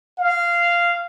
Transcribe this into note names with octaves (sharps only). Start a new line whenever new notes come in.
F5